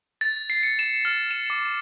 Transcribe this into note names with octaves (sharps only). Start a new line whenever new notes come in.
A6
C7
C#7
E7
F6
E7
D6